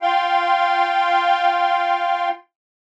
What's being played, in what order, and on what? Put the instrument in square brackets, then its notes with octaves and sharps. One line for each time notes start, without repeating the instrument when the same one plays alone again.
[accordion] F4 F5 G5 C6